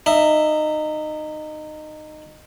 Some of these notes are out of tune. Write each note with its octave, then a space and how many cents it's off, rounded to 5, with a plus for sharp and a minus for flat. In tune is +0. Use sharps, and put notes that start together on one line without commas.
D#4 -20 E5 +0